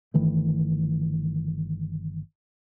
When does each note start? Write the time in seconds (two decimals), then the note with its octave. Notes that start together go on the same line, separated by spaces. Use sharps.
0.14 G1 D#3 E3 A3